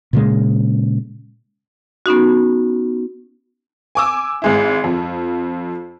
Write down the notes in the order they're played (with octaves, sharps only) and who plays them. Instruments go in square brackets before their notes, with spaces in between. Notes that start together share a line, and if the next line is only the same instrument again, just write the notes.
[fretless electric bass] A#2 C#3 G#3
[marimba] B3 C#4 D#4 F#4
[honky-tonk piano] G#5 D6 E6
G#1 G#3 E4
F2